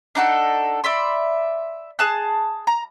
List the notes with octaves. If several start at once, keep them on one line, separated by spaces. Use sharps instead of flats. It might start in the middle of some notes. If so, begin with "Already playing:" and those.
D4 D#4 F#4 A4
D5 E5 B5 C6
G#4 A5 F#6
A#5